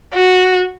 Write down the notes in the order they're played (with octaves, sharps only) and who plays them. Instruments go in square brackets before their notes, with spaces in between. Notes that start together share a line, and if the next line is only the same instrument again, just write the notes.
[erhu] F#4